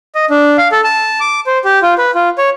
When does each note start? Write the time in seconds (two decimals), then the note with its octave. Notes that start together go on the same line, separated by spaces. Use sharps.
0.15 D#5
0.30 D4
0.58 F5
0.72 A4
0.84 A5
1.20 D6
1.47 C5
1.64 G4
1.82 F4
1.98 B4
2.15 F4
2.38 C#5